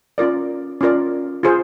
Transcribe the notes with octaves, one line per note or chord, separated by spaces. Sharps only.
C#4 F4 A#4 D5
C#4 F4 A#4 D5
F4 G#4 C5